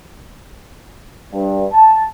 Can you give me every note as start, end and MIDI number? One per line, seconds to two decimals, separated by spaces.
1.34 1.65 43
1.73 2.04 81